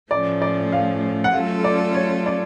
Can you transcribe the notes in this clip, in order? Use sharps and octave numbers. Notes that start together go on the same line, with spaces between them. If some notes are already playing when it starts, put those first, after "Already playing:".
A2 F3 A3 C#4 D5
D5
F5
F#5
F#3 A3 C#4 F4 A4 F5
D5
C#5
D5